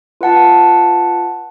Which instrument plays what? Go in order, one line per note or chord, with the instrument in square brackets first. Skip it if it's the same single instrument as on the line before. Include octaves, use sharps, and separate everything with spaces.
[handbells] F4 B4 F#5 A5